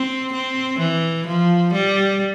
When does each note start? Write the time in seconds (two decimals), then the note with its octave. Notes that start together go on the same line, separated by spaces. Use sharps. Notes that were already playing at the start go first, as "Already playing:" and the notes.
Already playing: C4
0.32 C4
0.79 E3
1.27 F3
1.73 G3